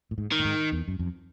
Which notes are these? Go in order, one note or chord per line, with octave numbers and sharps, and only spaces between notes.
A2
G#2
D#3
A2
G#2
E2
F#2
F2